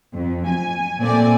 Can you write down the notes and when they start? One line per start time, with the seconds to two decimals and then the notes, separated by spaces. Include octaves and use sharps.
0.16 F2
0.50 G#5
1.00 A#2 A3 C4 D5 G#5